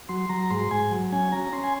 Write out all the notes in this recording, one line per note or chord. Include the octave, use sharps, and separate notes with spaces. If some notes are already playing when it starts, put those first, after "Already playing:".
F#3 C6
F#3 A#5
G#2 C6
G#2 G#5
F#3
C#4 G#5
C#4 A#5
C#4 C6
G#5